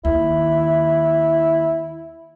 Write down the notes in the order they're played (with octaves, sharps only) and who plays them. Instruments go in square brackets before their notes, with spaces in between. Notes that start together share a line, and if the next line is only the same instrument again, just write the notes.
[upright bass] D#2 [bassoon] E4